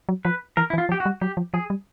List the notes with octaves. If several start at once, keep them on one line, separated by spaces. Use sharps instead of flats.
F#3
F3 B4
E3 A#4
E4
E3
F4
F3
G4
F#4
G3
F#3 G4
F3
F3 G#4
G3